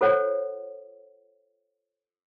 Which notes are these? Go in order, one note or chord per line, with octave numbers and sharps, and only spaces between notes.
F4 A4 C5 C#5 F#5